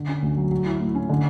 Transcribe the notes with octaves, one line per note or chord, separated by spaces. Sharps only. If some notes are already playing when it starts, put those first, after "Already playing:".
Already playing: D3
C#4
D2
F#3
F#3
E4
A2
C#4
D3